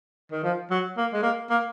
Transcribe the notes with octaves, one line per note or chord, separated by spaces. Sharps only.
D#3
F3
F#3
A#3
G#3
A#3
A#3